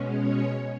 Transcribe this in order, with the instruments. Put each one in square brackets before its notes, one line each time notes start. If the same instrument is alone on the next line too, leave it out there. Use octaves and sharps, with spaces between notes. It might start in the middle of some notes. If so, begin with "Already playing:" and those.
Already playing: [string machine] B2 G#3 C#4
C#5